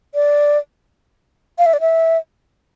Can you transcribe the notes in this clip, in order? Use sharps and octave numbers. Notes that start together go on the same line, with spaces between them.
D5
F5
E5
D5
E5